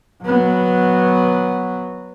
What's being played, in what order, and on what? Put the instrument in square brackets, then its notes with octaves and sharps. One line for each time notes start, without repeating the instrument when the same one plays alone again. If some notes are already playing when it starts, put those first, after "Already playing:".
[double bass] F#3 B3